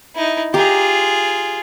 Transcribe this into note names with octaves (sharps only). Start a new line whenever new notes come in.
D#4 E4
F4 G4 G#4 A#5